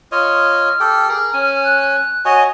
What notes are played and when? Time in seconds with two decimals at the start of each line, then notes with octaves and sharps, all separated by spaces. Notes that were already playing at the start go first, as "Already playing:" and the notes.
0.12 F4 C#5 D#5 F6
0.80 G4 A4 G5
1.09 G#4 A#4
1.34 C#4 G#5
1.64 F#6
2.25 F#4 C#5 D#5 G#5